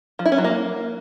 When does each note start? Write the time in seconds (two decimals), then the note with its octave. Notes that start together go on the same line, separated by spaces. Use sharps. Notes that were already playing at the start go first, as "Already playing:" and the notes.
0.19 F3
0.26 E4
0.32 C#4
0.38 F#3
0.44 A#3